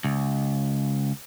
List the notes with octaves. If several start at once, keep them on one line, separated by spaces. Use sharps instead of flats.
C#2